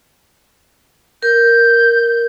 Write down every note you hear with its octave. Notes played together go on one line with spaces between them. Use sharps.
A#4 G6